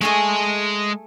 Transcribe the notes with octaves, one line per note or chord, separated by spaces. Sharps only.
G#3 A3 G#4 A4 D#5